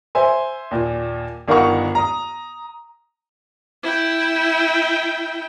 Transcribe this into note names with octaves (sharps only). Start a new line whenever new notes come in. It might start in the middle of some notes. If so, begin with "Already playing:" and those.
C5 E5 G#5 C6
D#2 A#2
G1 D#3 A#4 F5 F#5 C#6
A#5 D#6
E4 G5